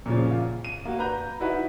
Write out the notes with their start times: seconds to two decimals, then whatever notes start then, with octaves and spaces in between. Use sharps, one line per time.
0.06 A#2 C#3 F3
0.31 F4
0.65 D#7
0.85 A#3 F#4
0.99 B4 A#5 G6
1.40 D#4 E4 F#4 B4 E5